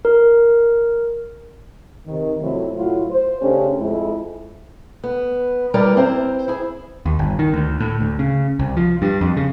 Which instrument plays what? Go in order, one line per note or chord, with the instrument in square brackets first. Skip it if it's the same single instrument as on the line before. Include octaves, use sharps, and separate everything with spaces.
[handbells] A#4
[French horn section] C3 D#3 D#4
F2 C3 F#3 A3 C4 E4
A2 F#3 E4 F4
C5
C#3 A3 C#4 D4 G4 C5
F2 G#3 E4
[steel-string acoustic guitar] B3
G3 E4 A#4 B4 D5 D#5
C4 E4 C5 A#5
E4 G#4
[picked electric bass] D#2
G1
D#3
D2
A2
D2
C#3
C2
F3
G2
F2
C#3